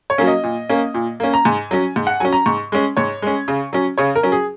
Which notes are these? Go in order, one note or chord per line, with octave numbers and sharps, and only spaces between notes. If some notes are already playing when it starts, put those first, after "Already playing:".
C#5
F#3 A#3 C#4
D#5
A#2
A#3 C#4
A#2
A#3 C#4
A#5
G#2 G#5
F#3 C#4
G#2
F#5
F#3 C#4 G#5
A#5
G#2 C#6
G#3 C#4
G#2 C#5
G#3 C#4
C#3
F#3 C#4
C#3 C#5
A#4
F#3 C#4
G#4